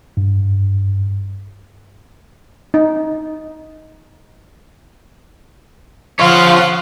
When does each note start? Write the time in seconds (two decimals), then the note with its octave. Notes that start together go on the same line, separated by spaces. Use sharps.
0.17 G2
2.74 D#4
6.19 F3 F4 C#5 F5 F#5